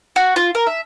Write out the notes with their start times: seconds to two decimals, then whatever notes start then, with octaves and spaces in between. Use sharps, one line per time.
0.16 F#4
0.36 F4
0.55 A#4
0.67 E5